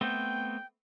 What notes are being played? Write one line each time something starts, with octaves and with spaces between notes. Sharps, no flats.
A3 B3 C4 G5